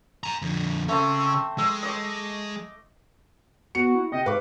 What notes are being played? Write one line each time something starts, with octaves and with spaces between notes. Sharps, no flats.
G#5 A#5
F2 D3
C#3 A3 C4 C#4 C5
G#3 E6
D#5 C#6 D6
B3 F#4 C#7
E4
C3 D#5 G5
G#2 B4 F5 D6